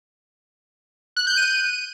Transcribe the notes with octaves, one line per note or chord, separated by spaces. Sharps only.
F#6
G6
D#7